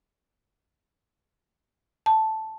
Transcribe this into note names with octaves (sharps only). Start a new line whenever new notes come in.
A5